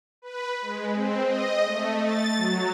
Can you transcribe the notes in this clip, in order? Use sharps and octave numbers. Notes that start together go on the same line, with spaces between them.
B4
G#3
C4
D#5
A3
A6
F#3